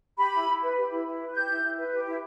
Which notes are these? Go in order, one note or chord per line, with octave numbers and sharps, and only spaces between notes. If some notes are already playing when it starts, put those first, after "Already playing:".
G4 B5
E4
E4
B4
G4
E4
E4
B4
G4 G6
E4
E4
B4
G4
E4